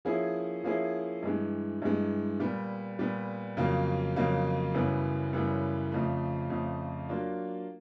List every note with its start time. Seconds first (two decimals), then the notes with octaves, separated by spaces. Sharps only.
0.05 F3 A#3 C#4 E4 G#4
0.64 F3 A#3 C#4 E4 G#4
1.23 G2 E3 G#3
1.82 G2 E3 G#3
2.40 A#2 G3 B3
2.99 A#2 G3 B3
3.57 F2 C#3 F#3 A#3
4.16 F2 C#3 F#3 A#3
4.74 F#2 C#3 E3 G3 B3
5.33 F#2 C#3 E3 G3 B3
5.92 F2 C#3 F3 A3
6.50 F2 C#3 F3 A3
7.09 F#3 A#3 D4 F4